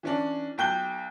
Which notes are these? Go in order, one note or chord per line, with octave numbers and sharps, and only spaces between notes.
E3 C#4 D4
B1 G5 G6 G7